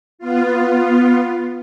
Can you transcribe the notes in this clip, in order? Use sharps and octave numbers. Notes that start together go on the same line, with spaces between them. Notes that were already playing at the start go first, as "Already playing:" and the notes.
B3 F4